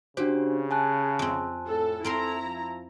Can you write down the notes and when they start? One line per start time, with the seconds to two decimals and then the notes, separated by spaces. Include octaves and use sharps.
0.17 C#3 D4 F#4 G4 C5
0.71 G#5 A5 F#6
1.19 F2 C4
1.68 A2 A4
2.04 C4 E4 A4 A#4 A#5 C6
2.43 F3